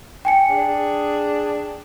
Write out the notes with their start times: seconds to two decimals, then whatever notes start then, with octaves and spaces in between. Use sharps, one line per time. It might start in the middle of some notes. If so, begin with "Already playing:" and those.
0.25 G5 G#5 C#7
0.50 D4 G#4